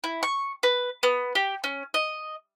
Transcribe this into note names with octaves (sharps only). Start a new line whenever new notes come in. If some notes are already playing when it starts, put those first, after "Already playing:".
E4
C#6
B4
B3
G4
C#4
D#5